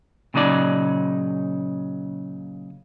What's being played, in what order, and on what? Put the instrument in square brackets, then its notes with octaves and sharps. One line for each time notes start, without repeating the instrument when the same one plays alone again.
[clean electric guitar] A#2 C#3 F#3 D#4 D5